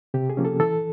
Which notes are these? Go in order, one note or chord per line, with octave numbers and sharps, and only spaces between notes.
C3 G4
G#4
F3 A#3 C#4
A4
E3 A4